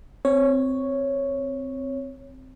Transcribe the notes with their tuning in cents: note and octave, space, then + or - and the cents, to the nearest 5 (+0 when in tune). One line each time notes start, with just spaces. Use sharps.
C4 -5 C#5 +0